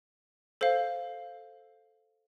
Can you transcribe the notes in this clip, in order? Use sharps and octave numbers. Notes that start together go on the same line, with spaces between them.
A4 C5 F5